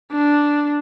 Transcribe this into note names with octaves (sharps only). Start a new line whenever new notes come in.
D4